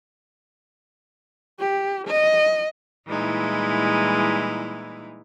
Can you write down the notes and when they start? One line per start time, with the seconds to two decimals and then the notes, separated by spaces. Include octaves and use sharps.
1.60 G4
2.08 D#5
3.08 A#2 E3 G3 G#3 D#4 E4